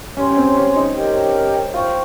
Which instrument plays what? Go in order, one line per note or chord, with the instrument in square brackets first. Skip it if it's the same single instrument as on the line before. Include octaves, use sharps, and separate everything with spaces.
[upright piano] C#4 [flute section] G4 C#5 G#5 C6
[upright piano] C#4
C4
C#4
D#4
[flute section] G4 A#4 D#5 G5
[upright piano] F4 [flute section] C5 G5 C#6